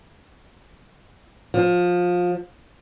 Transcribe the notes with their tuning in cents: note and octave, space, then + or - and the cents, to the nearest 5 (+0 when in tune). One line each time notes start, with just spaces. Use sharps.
F3 +20